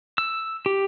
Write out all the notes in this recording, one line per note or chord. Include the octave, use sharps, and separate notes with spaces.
E6
G4